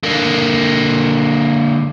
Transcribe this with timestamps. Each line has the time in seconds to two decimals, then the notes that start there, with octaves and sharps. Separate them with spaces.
0.03 D3 A#3